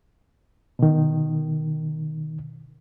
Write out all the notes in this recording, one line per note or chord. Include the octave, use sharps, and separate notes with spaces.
B2 D#3